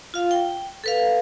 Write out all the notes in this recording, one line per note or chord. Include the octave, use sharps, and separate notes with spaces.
F4 F5
G5
A4 B4 F5